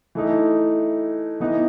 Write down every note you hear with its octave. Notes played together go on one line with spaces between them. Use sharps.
E3 A3 D#4
E3 B3 D#4